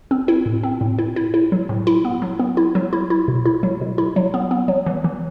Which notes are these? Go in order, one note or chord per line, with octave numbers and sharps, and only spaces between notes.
C4
E4
A2
C4
A2
E4
E4
E4
F#3
A2
E4
B3
F#3
B3
E4
F#3
E4
E4
B2
E4
F#3
B2
E4
F#3
B3
B3
F#3
E3
E3